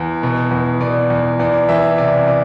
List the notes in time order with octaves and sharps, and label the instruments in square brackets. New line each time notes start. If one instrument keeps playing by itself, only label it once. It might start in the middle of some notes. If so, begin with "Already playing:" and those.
Already playing: [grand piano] E2
B2
E2
B2 D5
E2
E2 D5
E3 E5
C3 D5
D5